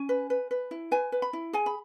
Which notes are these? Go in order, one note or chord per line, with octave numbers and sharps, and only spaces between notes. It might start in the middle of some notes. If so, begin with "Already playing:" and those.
Already playing: C#4 G#5
B4
B4
B4
E4
B4 G#5
B4
B5
E4
G#4 G#5
B5